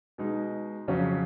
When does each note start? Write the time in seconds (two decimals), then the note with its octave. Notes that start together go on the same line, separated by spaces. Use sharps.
0.18 B2 G#3 D#4
0.88 F2 C#3 F#3 C#4